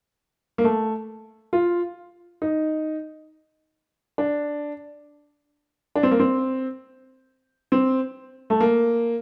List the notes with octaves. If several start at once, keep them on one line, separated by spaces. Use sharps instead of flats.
A#3
A3
F4
D#4
D4
D4
C4
A#3
C4
C4
A3
A#3